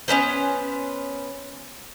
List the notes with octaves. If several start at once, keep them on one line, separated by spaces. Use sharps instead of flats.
B3 C#4 B4 C5